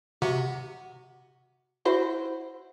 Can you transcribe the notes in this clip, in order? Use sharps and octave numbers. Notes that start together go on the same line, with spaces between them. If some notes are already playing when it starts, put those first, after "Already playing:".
C3 F#4
E4 F#4 C5